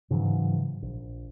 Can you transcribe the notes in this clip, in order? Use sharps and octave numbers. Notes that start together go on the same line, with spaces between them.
G#2 C#3 E3 F#3
A#1